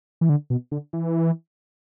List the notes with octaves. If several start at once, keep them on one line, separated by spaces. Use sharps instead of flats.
E3
D3
B2
D3
E3